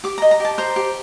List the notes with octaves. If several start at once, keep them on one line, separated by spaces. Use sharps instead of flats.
G4 D6
A#5
D#5
A#5
G4 A5
C5 A#5
G4